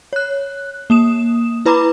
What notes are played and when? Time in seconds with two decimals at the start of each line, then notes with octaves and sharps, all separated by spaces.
0.13 C#5 F#6
0.90 A#3 D#6 E7
1.66 E4 B4 A#5 B5 D6